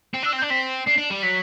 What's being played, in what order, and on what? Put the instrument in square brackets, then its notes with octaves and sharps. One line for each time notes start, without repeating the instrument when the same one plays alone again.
[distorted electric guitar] C4
[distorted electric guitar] D4 [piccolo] E6
[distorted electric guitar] C4
[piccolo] G6
[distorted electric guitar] D4
[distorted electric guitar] C4 [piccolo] B6
[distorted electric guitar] D4 [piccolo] C7
[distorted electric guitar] D4
G3
[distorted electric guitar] F#3 [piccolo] B6